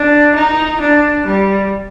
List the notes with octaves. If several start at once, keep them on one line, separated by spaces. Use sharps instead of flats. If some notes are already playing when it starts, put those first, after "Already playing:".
Already playing: D4
D#4
D4
G3